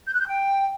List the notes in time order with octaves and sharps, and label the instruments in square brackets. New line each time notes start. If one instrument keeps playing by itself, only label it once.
[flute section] G6
F#6
G6
G5